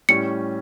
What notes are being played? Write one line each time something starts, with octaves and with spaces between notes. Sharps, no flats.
A2 G3 C#4 C#7